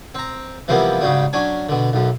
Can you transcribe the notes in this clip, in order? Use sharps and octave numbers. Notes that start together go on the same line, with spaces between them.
C4 A#5
C3 E3 F3 G3 A#3 B3
G#2 C#3 F#3 G3
F#3 C#4 D4 G#5
B2 D3
B1 F#2